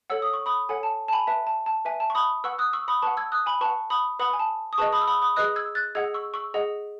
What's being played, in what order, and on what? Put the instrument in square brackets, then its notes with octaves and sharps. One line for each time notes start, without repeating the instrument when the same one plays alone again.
[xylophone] A4 C#5 F#5 E6
D#6
C#6
B5 D#6
A4 C#5 F#5 G#5
A5
A5
G#5 B5
B4 E5 A5
A5
A5
B4 E5 G#5
A5
C#6
B5 D#6
B4 F#5 C#6 E6
D#6 F#6
C#6 E6
B5 D#6
B4 F#5 A5 C#6
E6 G#6
D#6 F#6
G#5 B5
B4 F#5 A5 C#6
B5 D#6
B4 F#5 B5 D#6
G#5
A5
D#6
G#4 B4 D#5 A5 C#6
B5 D#6
E6
B5 D#6
B5 D#6
G#4 B4 D#5 D#6 F#6
E6 G#6
F#6 A6
G#4 D#5 F#5 E6 G#6
C#6 E6
C#6 E6
G#4 D#5 F#5